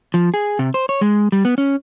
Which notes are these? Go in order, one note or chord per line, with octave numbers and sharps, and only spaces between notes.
F3
G#4
C3
C5
C#5
G#3
G3
B3
C#4